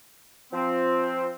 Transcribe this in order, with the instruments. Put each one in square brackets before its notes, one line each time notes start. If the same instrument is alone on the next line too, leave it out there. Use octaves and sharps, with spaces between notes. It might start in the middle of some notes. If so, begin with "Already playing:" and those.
[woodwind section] F3 C4